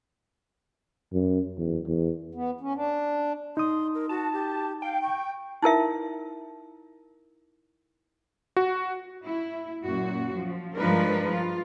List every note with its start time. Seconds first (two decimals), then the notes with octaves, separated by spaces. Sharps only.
1.13 F#2
1.58 E2
1.87 E2
2.35 B3
2.61 C#4
2.75 D4
3.57 D#4 C6 D#6
3.95 A#4
4.09 F#4 A5
4.33 G4
4.82 F5 G5
5.03 C#6
5.62 D#4 E4 A#4 E5
8.57 F#4
9.24 E4
9.83 F#2 A#2 F#4
10.32 F3
10.77 G2 F3 G#3 D4 A#4 B4
11.31 F4